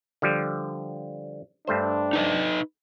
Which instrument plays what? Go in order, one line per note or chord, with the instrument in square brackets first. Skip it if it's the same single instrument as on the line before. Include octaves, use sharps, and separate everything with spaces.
[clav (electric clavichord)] D3 F3 G3
[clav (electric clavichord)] G2 A3 C5 [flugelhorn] D4
[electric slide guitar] D#4 B4 D#5